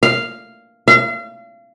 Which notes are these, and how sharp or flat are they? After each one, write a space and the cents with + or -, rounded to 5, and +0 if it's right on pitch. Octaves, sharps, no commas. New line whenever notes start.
F5 -5
F5 -35